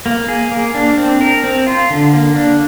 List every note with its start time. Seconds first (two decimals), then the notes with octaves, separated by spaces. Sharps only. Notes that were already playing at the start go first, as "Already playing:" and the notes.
0.06 A#3
0.28 G#4
0.52 A#3
0.75 D4
0.98 C4
1.21 A#4
1.44 C4
1.67 F4
1.90 D3
2.13 A#3
2.36 D4